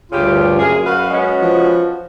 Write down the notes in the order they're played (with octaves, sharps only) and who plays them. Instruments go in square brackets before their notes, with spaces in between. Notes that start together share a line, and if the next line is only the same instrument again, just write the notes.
[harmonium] D2 G2 F4 [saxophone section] C#3 G4
[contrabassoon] F#2 [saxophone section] A#3 G#4
[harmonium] F#4 [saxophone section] B4 F5
[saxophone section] G#3 B3 C#4
[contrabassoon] F3